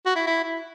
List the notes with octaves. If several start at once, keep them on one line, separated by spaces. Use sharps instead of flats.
F#4
E4
E4
E4